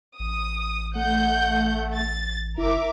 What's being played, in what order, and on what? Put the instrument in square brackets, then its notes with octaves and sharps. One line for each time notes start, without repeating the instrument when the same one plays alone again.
[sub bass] A1 [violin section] D#6
[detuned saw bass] A3 [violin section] F#5 G6
[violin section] A6
[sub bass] F#1 [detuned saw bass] E4 [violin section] A#4 E5 D6